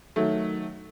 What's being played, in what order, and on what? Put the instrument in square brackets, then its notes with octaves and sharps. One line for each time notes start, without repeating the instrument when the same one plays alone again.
[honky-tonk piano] D#3 F#3 A3